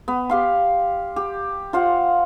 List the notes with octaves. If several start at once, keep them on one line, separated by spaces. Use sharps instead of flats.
B3
G4 F5 C6
G4
F4 C5 F5 F#5